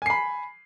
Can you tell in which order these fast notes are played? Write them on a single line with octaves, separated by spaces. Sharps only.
G#5 C7 B5